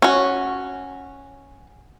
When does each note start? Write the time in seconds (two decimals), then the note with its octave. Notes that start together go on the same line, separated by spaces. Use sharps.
0.02 C#4 F#4